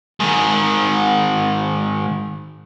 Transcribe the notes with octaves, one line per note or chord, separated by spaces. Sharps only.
G#2 D#3